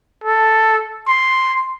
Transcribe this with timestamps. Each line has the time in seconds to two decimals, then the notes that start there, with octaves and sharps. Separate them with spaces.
0.24 A4
1.07 C6